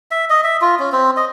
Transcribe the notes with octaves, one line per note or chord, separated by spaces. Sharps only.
E5
D#5
E5
F4
C#4
C4
D#5